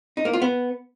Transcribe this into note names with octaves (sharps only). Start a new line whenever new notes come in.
D#4
A#3
F4
B3